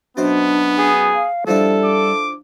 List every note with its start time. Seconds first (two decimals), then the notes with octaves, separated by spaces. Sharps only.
0.17 F#2 B2 B3 D4 C5
0.78 G#4
1.14 F5
1.47 F3 G3 D4 E4 A4
1.84 D6